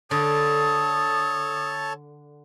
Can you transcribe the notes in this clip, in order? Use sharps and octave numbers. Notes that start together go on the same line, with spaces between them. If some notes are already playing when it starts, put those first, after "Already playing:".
D3 A4 C#5 A5 D#6